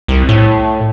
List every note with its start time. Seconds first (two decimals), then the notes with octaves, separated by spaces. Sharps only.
0.08 C2
0.29 A2